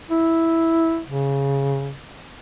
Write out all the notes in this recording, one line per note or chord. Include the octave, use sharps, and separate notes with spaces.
E4
C#3